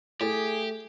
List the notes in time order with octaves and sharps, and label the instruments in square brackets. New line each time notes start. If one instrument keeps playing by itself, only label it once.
[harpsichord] A2 [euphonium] A3 [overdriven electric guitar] G4 [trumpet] G#4